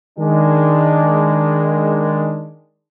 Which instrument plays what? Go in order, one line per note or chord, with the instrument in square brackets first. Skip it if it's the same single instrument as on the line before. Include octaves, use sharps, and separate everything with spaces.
[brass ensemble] D#3 G#3 D4